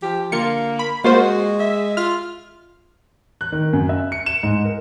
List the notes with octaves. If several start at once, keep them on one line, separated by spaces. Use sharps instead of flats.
F3 G4
D3 A#3 F4 C#7
B5
G#3 A#3 F4 F#4 C5
E5
F4 F6
F#6
D#3
F#2
E5
C#7
E7
G#2
A#4